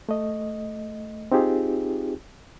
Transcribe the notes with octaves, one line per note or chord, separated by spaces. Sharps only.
A3 D#5
C4 D#4 F4 G4 G#4